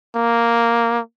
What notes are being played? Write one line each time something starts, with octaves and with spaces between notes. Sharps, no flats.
A#3